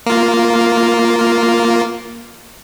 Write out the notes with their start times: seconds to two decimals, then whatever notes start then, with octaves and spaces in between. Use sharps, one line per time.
0.06 A#3 F4